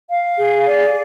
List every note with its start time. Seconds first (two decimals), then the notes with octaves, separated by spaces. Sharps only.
0.08 F5
0.38 G#4
0.67 D5